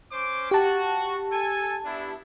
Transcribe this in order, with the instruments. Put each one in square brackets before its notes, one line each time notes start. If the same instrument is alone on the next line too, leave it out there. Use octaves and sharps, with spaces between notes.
[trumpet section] C#4 C5 D6
[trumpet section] F#4 [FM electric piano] G4 A5
[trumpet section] A4 G#5
B3 D4 E4